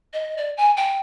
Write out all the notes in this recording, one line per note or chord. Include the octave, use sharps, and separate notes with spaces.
D#5
D5
G#5
G5